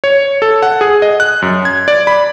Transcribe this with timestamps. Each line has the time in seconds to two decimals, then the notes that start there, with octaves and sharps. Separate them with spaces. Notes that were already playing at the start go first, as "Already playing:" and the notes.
0.04 C#5
0.42 A4
0.62 F#5
0.81 G#4
1.02 D#5
1.20 F#6
1.42 F#2
1.65 G#6
1.88 D5
2.07 B5